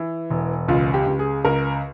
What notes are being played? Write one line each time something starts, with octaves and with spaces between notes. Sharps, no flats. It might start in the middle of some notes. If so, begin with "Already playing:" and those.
Already playing: E3
E1
C#2 F4
G4
C#2
G#4
C#2 A#4